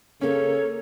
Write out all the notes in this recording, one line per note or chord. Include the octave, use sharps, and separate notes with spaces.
C#3 A#3 C#4 A4 C#5